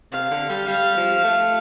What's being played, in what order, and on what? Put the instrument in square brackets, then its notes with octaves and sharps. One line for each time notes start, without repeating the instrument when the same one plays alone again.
[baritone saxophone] C3 [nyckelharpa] F5
[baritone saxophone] D3
G3
[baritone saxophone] G3 [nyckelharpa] F5
[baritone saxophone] F3
A3